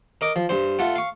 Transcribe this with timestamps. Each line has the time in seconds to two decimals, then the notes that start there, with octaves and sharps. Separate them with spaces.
0.21 A#4 D#5 D6
0.36 F3
0.49 G2 C5
0.79 A3 F4 F#5
0.96 F5 C#6